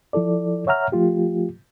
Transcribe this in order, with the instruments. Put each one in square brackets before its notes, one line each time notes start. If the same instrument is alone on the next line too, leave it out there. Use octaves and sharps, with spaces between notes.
[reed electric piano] F3 E4 A4 D5
C#5 E5 F#5 A#5 F6
F3 A3 F4 G4